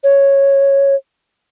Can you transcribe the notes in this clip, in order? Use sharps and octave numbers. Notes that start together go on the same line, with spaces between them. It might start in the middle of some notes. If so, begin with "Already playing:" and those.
C#5